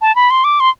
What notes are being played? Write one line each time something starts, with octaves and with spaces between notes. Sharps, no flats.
A5
B5
C6
D6
C6